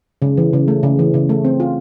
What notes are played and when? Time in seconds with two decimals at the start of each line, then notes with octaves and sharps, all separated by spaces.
0.22 C#3
0.37 E3
0.53 C#3
0.68 A3
0.83 C#3
0.99 E3
1.14 C#3
1.29 A3
1.45 C4
1.60 F4